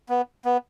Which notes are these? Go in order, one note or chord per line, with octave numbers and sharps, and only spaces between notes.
B3
B3